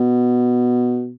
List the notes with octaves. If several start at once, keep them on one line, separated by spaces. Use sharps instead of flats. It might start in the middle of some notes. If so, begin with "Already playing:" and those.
Already playing: B2